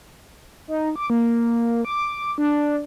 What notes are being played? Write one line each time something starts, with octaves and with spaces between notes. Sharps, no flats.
D#4
D6
A#3
D6
D4